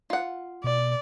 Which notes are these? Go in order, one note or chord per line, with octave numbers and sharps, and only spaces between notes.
F4 F#5
B2 D5